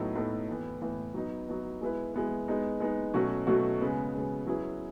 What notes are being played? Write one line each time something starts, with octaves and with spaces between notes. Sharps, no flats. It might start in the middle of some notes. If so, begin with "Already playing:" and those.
Already playing: A2 F#3 B3 D#4 A4
A2 F#3 B3 D#4 A4
A2 E3 B3
A2 E3 B3
F#3 B3 D#4
F#3 B3 D#4
G#3 B3 E4 B4
G#3 B3 E4 B4
G#3 B3 D#4
G#3 B3 D#4
B2 F#3 A3 C#4 F#4
B2 F#3 A3 C#4 F#4
C#3 G#3 B3
C#3 G#3 B3
F#3 C#4 E4 G#4 B4